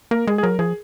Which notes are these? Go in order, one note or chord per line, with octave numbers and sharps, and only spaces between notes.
A#3 A#4
G#3 G#4
G#4
F#3 A#4
F3 G#4